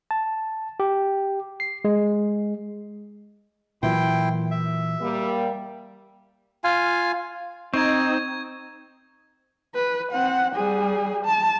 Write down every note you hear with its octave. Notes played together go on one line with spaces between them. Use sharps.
A5
G4
C7
G#3
A#2 E3 F#3 E4 G5 C6
E5
G3 A#3
F4 F5 G#5
C4 D#4 C#6 G#6
B4
C4 F#5
G3 G#4
A5